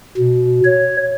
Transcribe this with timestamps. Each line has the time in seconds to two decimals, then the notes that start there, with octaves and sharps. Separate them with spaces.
0.17 B2
0.65 C#5